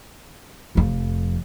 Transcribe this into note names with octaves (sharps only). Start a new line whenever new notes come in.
F1 F2